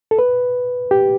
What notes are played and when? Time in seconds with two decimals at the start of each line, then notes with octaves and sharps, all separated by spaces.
0.11 A4
0.19 B4
0.91 G4